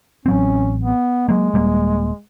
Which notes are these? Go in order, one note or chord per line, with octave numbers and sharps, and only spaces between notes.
A1 F#3 C4 C#4
B3
F#3 G#3 A#3
D#1 G3 A#3